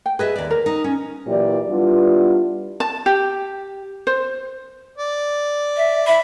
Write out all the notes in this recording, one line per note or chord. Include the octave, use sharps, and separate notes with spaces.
G5
G#4 B4 D#5 E5
D#2 D5
A#4
D#4
C#4
A#2 E3 F#3 E4 G4 D5
G3 B3 D4 E4 F4
A5
G4
C5
D5
E5
E5 B5